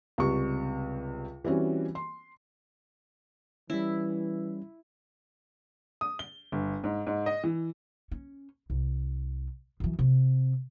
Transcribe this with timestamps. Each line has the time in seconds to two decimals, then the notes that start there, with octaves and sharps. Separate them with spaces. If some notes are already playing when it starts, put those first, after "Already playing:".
0.18 C#2 C3 G3 C#6
1.44 E3 G3 C4 C#4 F#4
1.95 C6
3.70 E3 G3 C#4 E4
6.01 D#6
6.19 G7
6.52 G1
6.84 G#2
7.07 G#2
7.26 D#5
7.44 E3
8.11 C#4
8.70 C2
9.80 F#2 E3
9.99 C3